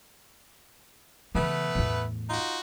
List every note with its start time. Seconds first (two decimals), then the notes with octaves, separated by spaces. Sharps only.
1.35 C#3 E3 A3 B3 B4
1.75 E2 A2
2.30 D#4 F4 F#4